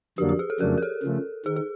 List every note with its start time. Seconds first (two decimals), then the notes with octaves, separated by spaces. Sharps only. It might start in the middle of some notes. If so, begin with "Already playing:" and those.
0.18 F2 D3 F#3 A#3 D4 G4
0.29 G4
0.39 G#4
0.50 A4
0.60 F2 C#3 F#3 A3 D4 A#4
0.78 A#4
0.82 A4
1.03 C#3 F3 A3
1.45 D#3 G#4
1.56 G#4